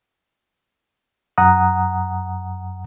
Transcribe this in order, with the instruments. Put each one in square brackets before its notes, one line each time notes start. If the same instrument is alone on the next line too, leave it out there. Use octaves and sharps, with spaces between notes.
[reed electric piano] F#2 F#5 A#5 D#6